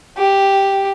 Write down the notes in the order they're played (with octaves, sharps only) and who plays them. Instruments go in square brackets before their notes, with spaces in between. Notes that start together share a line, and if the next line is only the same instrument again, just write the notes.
[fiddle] G4